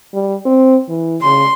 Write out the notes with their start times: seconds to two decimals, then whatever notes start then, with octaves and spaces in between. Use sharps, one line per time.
0.13 G3
0.45 C4
0.88 E3
1.22 C#3 C6